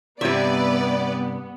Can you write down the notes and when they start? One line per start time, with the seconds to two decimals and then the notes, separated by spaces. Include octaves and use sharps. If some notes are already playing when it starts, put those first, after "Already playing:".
0.21 G2 C3 G3 B3 B4 D5 E5